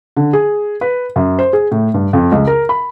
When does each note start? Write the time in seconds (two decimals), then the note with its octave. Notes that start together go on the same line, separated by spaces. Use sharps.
0.17 D3
0.33 G#4
0.81 B4
1.16 F#2
1.39 C5
1.53 G#4
1.71 A2
1.94 G2
2.13 F2
2.32 C#2
2.47 A#4
2.69 B5